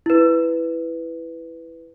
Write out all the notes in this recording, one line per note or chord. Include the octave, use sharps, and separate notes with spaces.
E4 B4